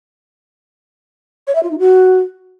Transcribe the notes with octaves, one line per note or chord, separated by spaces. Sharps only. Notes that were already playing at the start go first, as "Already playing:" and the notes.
C#5
E5
F4
D#4
F#4